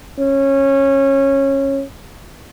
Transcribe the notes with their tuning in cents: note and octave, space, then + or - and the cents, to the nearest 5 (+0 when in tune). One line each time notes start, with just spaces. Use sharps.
C#4 -20